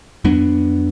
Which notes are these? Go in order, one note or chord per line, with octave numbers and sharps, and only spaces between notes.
F2 F#3 B3 D4